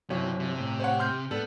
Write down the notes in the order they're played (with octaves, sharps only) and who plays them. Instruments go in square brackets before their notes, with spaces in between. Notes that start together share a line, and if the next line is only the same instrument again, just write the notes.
[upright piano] G1 C2 C#5 [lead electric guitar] C3 [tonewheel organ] F#3
[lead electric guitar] C3
[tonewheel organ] A2
[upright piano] C5 C#5 F#5
C6 F6 G6
[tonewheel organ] G#2 [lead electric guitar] B3 [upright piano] D4 A4